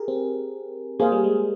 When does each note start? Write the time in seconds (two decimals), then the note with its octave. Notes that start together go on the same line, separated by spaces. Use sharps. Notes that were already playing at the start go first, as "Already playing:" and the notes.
Already playing: G4 G#4 A#4
0.08 C4
1.00 A#3 G#4 C5 F5
1.12 G3
1.24 G#3